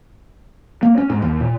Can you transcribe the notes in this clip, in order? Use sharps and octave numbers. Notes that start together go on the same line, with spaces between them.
A#3
C#4
G#2
D#2
A#2